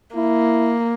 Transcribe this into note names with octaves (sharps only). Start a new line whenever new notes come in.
A#3 E4